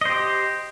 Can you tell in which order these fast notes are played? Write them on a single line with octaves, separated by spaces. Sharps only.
D#5 C5 G4